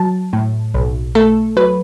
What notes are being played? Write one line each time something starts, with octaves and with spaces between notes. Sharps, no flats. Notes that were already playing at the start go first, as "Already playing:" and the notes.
Already playing: F#3 A5
A2
B1
A3 A4
F#3 B4